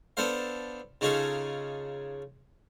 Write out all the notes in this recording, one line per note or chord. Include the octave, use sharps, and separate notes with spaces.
B3 D4 A4 C5 F5
C#3 C#4 D#4 F4 G#4 A4